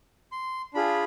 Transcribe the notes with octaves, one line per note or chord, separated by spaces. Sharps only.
C6
D4 F4 G#4 B5